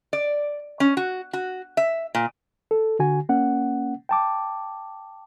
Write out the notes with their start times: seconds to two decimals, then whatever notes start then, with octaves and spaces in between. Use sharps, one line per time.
0.13 D5
0.80 C#4
0.97 F#4
1.33 F#4
1.77 E5
2.15 A#2
2.71 A4
2.99 D3 F#4 G#5
3.29 A#3 C#4 F#5
4.09 G5 A5 D6